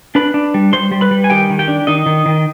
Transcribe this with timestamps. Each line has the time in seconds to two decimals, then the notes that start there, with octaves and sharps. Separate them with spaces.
0.15 D4 B4 B5
0.34 D4
0.54 G3
0.73 G3 C5 C6
0.91 G3
1.01 B4 B5
1.11 G3
1.24 G#5
1.30 D#3 G4 G5
1.50 D#3
1.59 G4 G5
1.68 D4
1.87 D#3 D#4 D#5
2.06 D#3
2.26 D#3